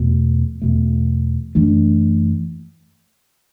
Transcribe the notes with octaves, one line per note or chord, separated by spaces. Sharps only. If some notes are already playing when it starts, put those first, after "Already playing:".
Already playing: E2 B2 A3
E2 B2 A3
F#2 E3 A3 D4